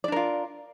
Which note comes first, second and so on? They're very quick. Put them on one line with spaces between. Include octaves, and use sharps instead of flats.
D5 D4 A#4 F4